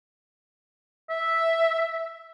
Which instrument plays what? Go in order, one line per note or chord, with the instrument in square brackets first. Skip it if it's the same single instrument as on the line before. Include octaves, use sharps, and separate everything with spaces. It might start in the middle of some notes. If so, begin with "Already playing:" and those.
[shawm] E5